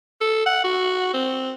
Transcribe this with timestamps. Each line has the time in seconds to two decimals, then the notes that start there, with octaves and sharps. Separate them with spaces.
0.21 A4
0.46 F#5
0.64 F#4
1.14 C4